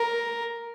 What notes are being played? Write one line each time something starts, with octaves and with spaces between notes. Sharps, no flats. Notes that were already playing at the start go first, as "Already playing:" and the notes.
Already playing: A#4